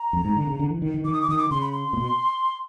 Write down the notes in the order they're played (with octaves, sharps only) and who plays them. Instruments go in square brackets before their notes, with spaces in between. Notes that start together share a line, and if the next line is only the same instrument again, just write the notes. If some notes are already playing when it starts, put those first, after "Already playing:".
Already playing: [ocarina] A#5
[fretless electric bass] F2
G#2
D3
C#3
D3
E3
D#3
D#3
[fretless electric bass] D#3 [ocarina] D6
[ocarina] D#6
D6
[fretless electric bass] D#3 [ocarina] D#6
[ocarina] D6
[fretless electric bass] C#3 [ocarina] C6
[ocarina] B5
C6
[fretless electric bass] A#2
B2